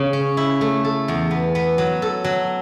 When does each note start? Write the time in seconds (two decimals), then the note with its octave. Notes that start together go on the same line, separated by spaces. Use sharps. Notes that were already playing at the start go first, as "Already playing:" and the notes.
Already playing: C#3
0.13 C#4
0.37 E4
0.61 A3
0.85 A4
1.08 E2
1.31 B3
1.55 B3
1.78 F#3
2.02 A4
2.24 F#3